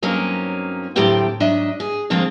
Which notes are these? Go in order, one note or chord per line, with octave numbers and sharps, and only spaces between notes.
G2 F#3 A#3 C4 C#4 D#4
D2 A2 F#3 C4 G4 G5
G#2 F#3 D4 D#5 E5
G#4
D3 D#3 F3 G#3 C4